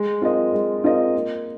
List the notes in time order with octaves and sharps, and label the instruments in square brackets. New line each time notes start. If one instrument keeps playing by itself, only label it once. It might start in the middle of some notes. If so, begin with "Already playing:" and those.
Already playing: [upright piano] G#3
C4 F4 A#4 D#5
G#3
C4 F4 A#4 D#5
A#3